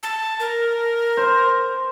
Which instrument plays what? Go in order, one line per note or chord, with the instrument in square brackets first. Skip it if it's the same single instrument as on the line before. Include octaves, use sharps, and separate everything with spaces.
[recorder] A5
A#4
[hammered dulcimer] C5